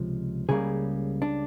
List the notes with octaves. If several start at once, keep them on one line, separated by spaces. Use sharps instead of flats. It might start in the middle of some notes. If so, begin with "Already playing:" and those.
Already playing: C#2 C3 F3
C#2 C#3 E3 G3 A#3 G#4
D4